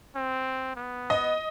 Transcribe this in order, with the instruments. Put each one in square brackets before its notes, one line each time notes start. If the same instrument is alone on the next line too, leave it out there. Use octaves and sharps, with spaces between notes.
[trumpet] C4
B3
[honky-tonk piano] D#5